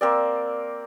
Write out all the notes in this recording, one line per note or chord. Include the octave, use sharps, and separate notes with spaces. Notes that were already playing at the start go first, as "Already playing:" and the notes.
A#3 C4 D5